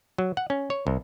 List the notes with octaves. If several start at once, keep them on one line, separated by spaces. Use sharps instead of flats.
F#3
F#5
C#4
C#5
C2